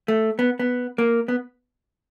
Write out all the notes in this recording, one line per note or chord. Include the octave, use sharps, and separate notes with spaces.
A3
B3
B3
A#3
B3